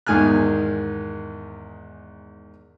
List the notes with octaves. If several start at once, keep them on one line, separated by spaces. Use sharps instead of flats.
E2 G#2 D#3 G#5 F6 F#6